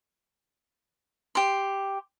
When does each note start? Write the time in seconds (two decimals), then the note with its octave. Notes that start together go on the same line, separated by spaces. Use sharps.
1.35 G4 C6